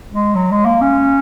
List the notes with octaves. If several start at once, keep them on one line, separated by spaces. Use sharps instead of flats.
G#3
F#3
G#3
A#3
C#4